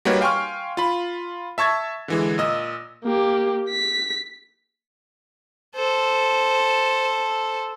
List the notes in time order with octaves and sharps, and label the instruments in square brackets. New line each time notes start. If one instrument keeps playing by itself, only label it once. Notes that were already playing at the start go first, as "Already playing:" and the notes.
[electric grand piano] G3 A#3 D#4 F#4 B4 C#5
F5 G5 G#5 C6 C#6 F6
F4 B5
E5 A5 C#6 G#6 A6
D3 E3 G#3
A#2 D#5 E6
[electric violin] A#3 G4
B6
[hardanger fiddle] A4 C5